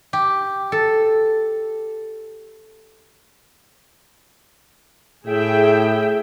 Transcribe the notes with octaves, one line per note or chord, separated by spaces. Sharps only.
G4
A4
A2 G#4 E5 G5